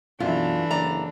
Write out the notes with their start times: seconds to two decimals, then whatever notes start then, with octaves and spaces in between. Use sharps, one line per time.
0.20 F#2 B2 E3 A3 D4 F4
0.71 F#1 D5 A#5